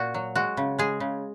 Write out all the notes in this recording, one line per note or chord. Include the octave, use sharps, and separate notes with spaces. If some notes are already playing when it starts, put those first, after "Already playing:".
Already playing: A#2 F#4
F#3
G#3 F#4
C#3
G#3 G#4
C#3